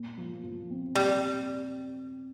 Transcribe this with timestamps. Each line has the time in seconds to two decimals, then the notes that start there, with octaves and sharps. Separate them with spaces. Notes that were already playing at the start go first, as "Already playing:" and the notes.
Already playing: A#2
0.18 F3
0.44 F3
0.71 C4
0.95 A#2 G3